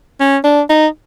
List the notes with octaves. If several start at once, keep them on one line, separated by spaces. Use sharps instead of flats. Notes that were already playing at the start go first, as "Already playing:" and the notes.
C#4
D4
D#4